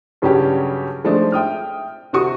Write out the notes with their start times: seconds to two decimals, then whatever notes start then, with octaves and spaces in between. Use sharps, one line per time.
0.22 G2 C#3 F#3 C#4 D4 G4
1.04 F3 G#3 A3 C4 D4 D#4
1.32 E5 G5 D#6 F6
2.13 C3 F#4 C#6 D#6